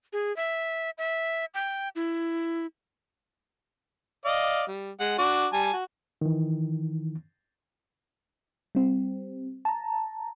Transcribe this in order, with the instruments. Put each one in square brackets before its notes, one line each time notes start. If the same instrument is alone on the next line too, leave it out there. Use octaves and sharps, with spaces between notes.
[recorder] G#4
E5
E5
G5
E4
[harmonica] D5 D#5 F5
G3
G#3 F#5
D4 F#4 D6
G3 G#5 A5
F#4
[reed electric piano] D#3 E3
[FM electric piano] G3 C4
A5 A#5